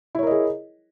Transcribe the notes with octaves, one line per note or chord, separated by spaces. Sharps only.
E4 G#4 A#4 C#5 D#5